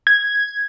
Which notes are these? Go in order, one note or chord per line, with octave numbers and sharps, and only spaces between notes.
G#6